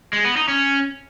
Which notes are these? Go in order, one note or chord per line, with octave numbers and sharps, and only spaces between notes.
G#3
B3
D#4
C#4